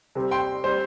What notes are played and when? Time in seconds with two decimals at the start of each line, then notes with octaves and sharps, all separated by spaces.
0.15 C3 G3 C4
0.31 G5 C6
0.64 G3 C4 C5